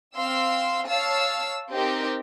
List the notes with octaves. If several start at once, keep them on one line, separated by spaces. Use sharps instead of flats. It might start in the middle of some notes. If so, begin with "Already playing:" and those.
C4 F5 C6 E6
C#5 F5 A5 E6
C4 D#4 G4 A#4